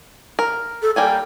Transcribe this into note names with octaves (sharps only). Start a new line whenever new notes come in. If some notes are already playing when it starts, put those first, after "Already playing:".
A#4
A4
G3 A#3 G5 G#5